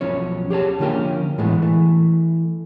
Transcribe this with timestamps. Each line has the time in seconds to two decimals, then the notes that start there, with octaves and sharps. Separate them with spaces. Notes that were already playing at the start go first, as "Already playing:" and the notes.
0.01 B1 F3 C#4 C#5
0.50 G4 G#4 C#5 A5
0.80 D3 F3 A#3 C#4 G5
1.38 A2 E3 G#3 A3 B3
1.62 E3 A3